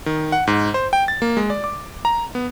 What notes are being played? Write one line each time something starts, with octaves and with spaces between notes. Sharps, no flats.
D#3
F#5
G#2
C5
G5
A6
A#3
G#3
D5
D6
A#5
B3